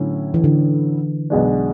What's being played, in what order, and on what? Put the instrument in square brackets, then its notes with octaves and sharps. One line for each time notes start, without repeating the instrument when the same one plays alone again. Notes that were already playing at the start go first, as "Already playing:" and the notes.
Already playing: [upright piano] A2 F#3 C#4 E4 [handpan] D3
[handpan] E3
D3
[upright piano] B1 B2 G#3 D4